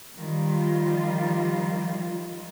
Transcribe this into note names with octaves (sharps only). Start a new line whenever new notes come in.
D#3 F3 G3 F4